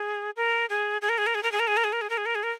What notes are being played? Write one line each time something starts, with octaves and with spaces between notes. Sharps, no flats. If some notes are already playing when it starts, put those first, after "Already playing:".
Already playing: G#4
A#4
G#4
G#4
A#4
G#4
A#4
G#4
A#4
G#4
A#4
G#4
A#4
G#4
A#4
G#4
A#4
G#4
A#4
G#4
A#4